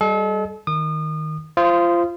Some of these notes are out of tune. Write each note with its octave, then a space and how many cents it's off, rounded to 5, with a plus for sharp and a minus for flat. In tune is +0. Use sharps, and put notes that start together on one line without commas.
G3 +0 A4 -40 D#5 +0
D#3 +0 D#6 -35
F4 -25 C5 +0 D#6 +0